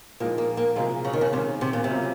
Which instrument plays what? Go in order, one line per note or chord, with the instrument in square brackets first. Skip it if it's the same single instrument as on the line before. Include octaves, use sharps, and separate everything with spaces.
[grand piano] A#2 F3 G#3 D#4 A#4 [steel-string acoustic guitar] A#3
[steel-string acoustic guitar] A#3
A#3
[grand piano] C3 F#3 A#3 F4 G#4 [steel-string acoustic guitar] G#3
[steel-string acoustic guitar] C#3
D#3
C#3
[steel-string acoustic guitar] C3 [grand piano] D#3 G#3 C#4
[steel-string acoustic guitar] C3
A#2
C3
[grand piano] C#3 F#3 A#3 C#4 F4